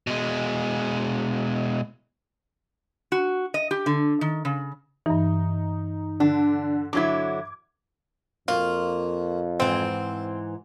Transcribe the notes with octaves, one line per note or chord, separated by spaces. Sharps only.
B2 G#3
F#4
D#5
G4
D3
D#3
C#3
G2 E3 D#4
D3 D4
D3 F#3 E4 D6 G#6
F2 A#3 F4 F#4
G#2 E3 C4 E4